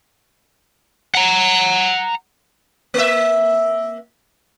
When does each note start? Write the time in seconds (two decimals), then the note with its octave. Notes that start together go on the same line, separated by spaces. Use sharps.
1.15 F#5 A#5
2.94 A#3 E5